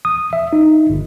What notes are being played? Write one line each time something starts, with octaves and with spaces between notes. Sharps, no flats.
D#6
E5
D#4
G1